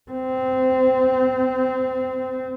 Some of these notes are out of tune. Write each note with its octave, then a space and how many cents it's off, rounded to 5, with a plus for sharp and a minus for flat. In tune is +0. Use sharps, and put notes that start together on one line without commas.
C4 -20